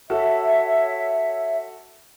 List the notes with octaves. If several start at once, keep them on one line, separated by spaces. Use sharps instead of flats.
F#4 A4 C#5 E5